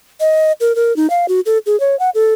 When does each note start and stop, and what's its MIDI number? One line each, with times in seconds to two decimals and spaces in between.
0.20 0.52 75
0.60 0.75 70
0.75 0.95 70
0.96 1.09 63
1.10 1.26 77
1.28 1.40 66
1.46 1.58 69
1.66 1.78 68
1.80 1.98 73
1.99 2.10 78
2.14 2.34 69